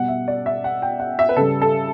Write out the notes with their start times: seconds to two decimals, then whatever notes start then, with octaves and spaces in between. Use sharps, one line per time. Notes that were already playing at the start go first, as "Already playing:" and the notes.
Already playing: B2 G3 F#5
0.08 E5
0.28 D5
0.46 E5
0.64 F#5
0.82 G5
1.00 F#5
1.19 E5
1.29 B4
1.36 C#3 G3 A4
1.62 A4